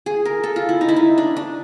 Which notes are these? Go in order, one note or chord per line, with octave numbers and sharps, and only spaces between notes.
G#4
A#4
A4
F4
E4
D#4
E4
D#4
D4
D4